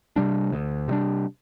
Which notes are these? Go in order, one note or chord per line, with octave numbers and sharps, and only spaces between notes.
C3 G3 D4
D2
C3 G3 D4